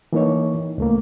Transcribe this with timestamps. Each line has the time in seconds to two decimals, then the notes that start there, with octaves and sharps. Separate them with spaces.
0.13 E3 A#3 D#4 C#5
0.78 C#2 A3 A#3